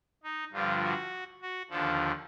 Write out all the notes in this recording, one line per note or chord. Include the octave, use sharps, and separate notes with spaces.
D#4
G2 D3 F3 F4
F#4
F#4
D#2 D3 F3 A4